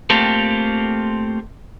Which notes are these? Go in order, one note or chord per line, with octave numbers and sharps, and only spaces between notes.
A3 A#3 C4 F4 G4 A4